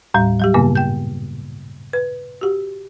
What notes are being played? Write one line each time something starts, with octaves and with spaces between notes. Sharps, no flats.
D#2 A2 G3
F#3 G3 G4
G2 A#2 C#3 A#3 B3
G5 G6
B4
F#4 G4